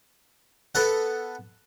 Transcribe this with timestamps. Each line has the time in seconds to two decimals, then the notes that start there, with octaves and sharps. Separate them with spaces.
0.75 B3 A4 F#5